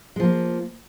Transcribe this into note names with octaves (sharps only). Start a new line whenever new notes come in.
F3 G#3 A#3